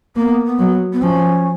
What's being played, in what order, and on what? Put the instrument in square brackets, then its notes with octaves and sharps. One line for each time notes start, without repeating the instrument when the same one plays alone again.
[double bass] A#3 [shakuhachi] B3
[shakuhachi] B3
[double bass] F#3
[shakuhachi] B3
[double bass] F3 [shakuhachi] C#4